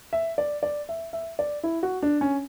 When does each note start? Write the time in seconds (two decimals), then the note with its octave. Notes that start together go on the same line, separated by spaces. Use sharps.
0.13 E5
0.38 D5
0.63 D5
0.89 E5
1.13 E5
1.39 D5
1.63 E4
1.83 F#4
2.02 D4
2.21 C#4